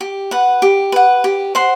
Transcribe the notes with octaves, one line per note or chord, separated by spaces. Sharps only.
G4
B4 F#5
G4
B4 F#5
G4
C5 F#5 C6